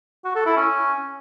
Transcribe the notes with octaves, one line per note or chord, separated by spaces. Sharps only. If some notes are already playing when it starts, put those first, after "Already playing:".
F#4
A4
E4
C#4